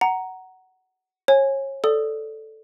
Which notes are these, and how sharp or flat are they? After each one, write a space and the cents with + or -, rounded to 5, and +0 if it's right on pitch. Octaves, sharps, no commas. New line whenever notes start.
F#5 +15 A#5 +0
C#5 -30 G#5 +0
A4 +0 D5 +5 D#6 +0